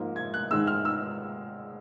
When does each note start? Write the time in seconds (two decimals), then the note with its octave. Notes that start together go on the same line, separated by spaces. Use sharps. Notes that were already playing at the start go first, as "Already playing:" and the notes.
Already playing: G#2 F3 A#3
0.16 G#6
0.34 F#6
0.51 G#2 D#3 G#3 E6
0.67 F6
0.85 E6